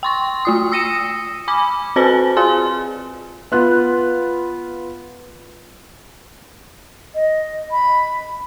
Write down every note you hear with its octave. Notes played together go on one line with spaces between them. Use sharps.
G5 C6 C#6
A3 F4 D#6
D#6 E6 A#6 C#7 D#7 E7
G#5 B5 D6
C4 F#4 B4 C5 G#5 A5
F4 G#4 G#5 C6
B3 F4 F#6
D#5
B5